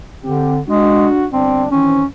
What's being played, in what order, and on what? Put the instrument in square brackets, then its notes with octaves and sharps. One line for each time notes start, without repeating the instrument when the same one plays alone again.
[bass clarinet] D3 [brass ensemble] C4 G4
[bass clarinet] G#3 [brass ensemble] D4 F#4
[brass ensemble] G1 D4 [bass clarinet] C4
[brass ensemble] D#3 E3 C4 [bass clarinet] C#4